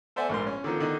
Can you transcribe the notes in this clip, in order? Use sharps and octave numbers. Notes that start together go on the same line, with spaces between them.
A4 C5 D5 E5 F#5 G#5
A#1 G#2 A#4 C6
C#4
D3 D#3 F3
D3 D#3 D#4